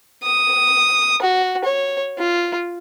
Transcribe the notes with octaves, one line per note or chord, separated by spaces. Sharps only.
D#6
F#4
C#5
F4